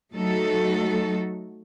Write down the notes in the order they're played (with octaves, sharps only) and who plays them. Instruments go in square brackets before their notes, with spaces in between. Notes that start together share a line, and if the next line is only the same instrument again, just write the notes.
[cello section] F#3 A3 D#4 F#4 A4